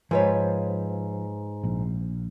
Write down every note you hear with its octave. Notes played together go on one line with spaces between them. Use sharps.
G#2 F3 B4 C#5
A#1